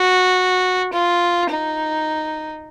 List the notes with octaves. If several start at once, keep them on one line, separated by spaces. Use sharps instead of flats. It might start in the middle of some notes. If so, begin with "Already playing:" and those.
Already playing: F#4
F4
D#4